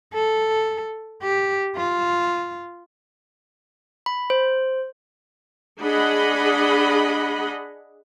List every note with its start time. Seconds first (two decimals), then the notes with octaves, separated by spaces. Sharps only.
0.14 A4
1.23 G4
1.76 F4
4.06 B5
4.30 C5
5.82 D4 G#4 D#5 F#5 B5